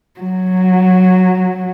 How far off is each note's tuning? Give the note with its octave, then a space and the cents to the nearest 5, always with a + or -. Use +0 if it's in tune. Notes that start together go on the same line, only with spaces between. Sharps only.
F#3 -5